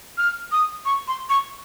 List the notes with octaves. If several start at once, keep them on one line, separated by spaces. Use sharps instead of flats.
F6
D#6
C#6
C6
C#6